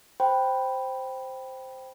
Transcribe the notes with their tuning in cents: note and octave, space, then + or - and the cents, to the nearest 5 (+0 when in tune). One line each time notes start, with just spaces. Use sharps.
C5 +0 G5 +0 B5 +0